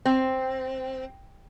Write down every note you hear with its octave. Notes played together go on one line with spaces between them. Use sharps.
C4